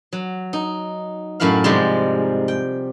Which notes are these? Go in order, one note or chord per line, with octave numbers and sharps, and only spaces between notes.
F#3
D#4
F#2 A2 E4 F#4 F5
G#2 C3 F3 G3 G#3
G5